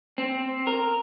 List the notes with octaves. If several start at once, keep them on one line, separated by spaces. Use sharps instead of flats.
C4
A#4